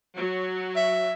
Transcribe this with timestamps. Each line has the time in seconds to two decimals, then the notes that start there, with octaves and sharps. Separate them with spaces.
0.17 F#3
0.76 E5